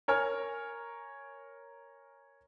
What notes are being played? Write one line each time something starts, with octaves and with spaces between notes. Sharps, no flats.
A#4 C#5 G#5 F6